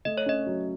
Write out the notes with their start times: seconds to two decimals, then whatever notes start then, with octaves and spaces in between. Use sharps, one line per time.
0.05 A3 D#5
0.18 C#5
0.26 C#4 D#5
0.46 F#3